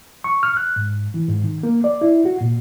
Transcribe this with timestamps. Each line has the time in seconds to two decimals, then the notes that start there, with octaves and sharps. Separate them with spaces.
0.24 C#6
0.43 F6
0.57 F#6
0.76 G#2
1.14 E3
1.28 G#2
1.44 D#3
1.63 A#3
1.84 D5
2.01 E4
2.25 F#4
2.41 A#2